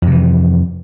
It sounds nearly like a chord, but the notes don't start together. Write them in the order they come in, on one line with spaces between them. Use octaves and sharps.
F2 C3 E3